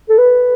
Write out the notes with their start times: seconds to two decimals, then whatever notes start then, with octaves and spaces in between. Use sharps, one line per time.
0.10 A4
0.18 B4